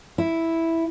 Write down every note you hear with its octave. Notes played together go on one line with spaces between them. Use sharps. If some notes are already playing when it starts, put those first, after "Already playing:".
E4